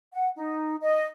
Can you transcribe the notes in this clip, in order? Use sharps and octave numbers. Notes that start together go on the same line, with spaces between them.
F#5
D#4
D#5